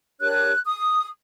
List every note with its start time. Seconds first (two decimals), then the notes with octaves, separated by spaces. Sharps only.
0.19 D4 G4 A#4 C#5 F#6
0.66 D#6